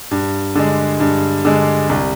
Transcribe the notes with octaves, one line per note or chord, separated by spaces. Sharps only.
G2
D3 G#3
G2
D3 G#3
C2